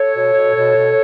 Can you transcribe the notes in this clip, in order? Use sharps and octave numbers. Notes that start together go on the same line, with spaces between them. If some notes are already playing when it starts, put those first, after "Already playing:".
Already playing: A4 C#5
B2
B2
B2
B2